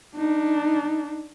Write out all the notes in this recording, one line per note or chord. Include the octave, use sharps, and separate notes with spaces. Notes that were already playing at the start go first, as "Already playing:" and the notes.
D4 D#4